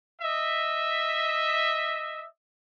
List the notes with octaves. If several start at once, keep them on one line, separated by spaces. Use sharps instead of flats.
D#5 E5